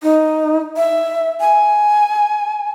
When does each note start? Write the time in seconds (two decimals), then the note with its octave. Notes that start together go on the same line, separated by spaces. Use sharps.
0.03 D#4
0.77 E5
1.40 G#5